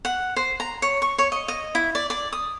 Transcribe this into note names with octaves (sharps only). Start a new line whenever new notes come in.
F#5
C5
A#5
C#5
C#6
C#5
D#5
D#5
E4
D5
D5
D#6